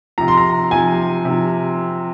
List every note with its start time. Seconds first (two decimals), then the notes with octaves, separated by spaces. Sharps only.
0.18 C3 F3 A#5
0.28 C6
0.37 A#5
0.71 C3 F3 G#5
1.25 C3 F3